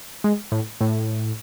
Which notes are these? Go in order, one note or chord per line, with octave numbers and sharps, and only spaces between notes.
G#3
A2
A2